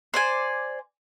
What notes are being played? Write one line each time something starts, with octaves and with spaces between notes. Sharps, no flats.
C5 D5 G#5